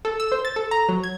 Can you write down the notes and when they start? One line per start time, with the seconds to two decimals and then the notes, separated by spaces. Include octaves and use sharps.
0.05 A4
0.20 E6
0.32 C5
0.45 A6
0.56 A4
0.71 A#5
0.89 F#3
1.03 G#6